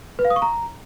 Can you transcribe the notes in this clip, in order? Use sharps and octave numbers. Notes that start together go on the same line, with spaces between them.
B4
F5
D#6
C#6
A#5